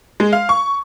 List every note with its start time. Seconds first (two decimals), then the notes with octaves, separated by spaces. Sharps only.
0.20 G#3
0.33 F5
0.49 C#6